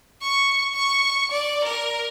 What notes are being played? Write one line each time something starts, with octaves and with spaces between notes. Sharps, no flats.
C#6
C#6
D5
A#4